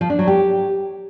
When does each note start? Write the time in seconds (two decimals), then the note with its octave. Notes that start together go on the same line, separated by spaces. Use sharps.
0.01 F3
0.10 D4
0.19 F#3
0.28 G4